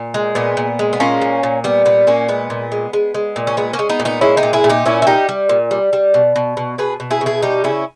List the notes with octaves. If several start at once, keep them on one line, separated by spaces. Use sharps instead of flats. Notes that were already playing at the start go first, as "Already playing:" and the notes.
Already playing: A#2
G#3
A#2 B3
A#2
G#3
B3
A#2 A#3 C#4
A#2
A#2
G3 B3
A#2 B3
A#2 A#3 C#4
G#3 B3
A#2
G#3
G#3
G#3
A#2
C#4
G#3 B3
A#3 C#4
G#3
B3 D#4
A#2
B3 D#4
G#3 C#4 E4
D#4 G4
A#2
E4 G#4
A#2
D#4 G4
A#2 C#4 E4
E4
G3 D#4 G4
G3
A#2
G3
G3
B2
B2
B2
B2 G#4 B4
B2
E4 G#4
B2
E4 G#4
G3 D#4 G4
C#3 C#4 E4